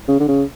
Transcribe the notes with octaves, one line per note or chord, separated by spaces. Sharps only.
C#3
D3
C#3